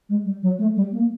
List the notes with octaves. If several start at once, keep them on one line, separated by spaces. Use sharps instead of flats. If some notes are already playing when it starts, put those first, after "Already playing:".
G#3
G3
F#3
A3
G3
A#3